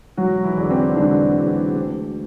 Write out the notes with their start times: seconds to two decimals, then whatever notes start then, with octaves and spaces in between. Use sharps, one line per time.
0.17 E1 F#3 F#4
0.44 E3 E4
0.57 E2 D3
0.70 C4
0.96 E1 D3 D4
1.36 E2 D3
1.76 D2